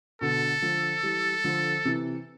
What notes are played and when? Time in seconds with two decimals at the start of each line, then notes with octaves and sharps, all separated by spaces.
0.21 B2 D3 A4
0.62 D3 F3
1.03 E3 G3
1.44 D3 F3
1.85 C3 E3